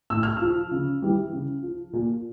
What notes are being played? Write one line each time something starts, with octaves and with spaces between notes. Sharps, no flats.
A2 E6
F6
F3 E6
C#3
E3 G3
C#3
F3
A#2